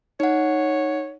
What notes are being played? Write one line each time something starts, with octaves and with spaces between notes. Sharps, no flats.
D#4 C#5 F#5